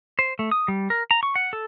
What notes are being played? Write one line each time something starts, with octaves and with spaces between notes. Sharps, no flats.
C5
A3
D#6
G3
A#4
A#5
C#6
F#5
A4